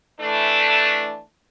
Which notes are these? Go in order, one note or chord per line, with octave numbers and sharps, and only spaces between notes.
E3 A3 D4